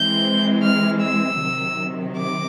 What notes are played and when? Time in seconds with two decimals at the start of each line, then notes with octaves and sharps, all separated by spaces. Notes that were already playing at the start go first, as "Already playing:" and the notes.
Already playing: E3 G#3 C4 G6
0.63 F6
1.01 E6
1.40 C3 D#3 F#3
2.17 D6